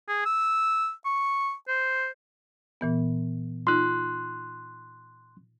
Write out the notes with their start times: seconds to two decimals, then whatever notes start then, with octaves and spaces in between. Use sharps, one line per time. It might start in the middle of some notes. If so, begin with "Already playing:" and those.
0.08 G#4
0.26 E6
1.05 C#6
1.68 C5
2.81 A#2 E3 B3
3.67 D#4 F4 C6 F#6